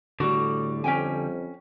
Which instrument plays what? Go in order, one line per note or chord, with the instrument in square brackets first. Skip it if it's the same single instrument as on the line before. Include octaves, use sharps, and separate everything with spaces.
[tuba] A2 [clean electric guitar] D3 G3 [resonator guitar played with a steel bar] F#4
[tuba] F2 [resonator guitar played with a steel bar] C#4 G5 G#5